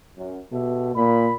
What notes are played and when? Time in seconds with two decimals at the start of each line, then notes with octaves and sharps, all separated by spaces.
0.17 F#2
0.52 B2 G4 A4 E5
0.96 A#2 B5